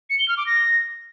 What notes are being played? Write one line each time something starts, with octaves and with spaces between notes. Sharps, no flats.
C#7
G7
F6
D6
A#6